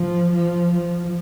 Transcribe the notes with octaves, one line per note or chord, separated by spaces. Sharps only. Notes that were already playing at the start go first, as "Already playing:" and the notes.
Already playing: F3
F3
F3